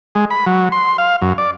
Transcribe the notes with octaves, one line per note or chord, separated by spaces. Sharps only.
G#3
B5
F#3
C6
F5
F#2
D5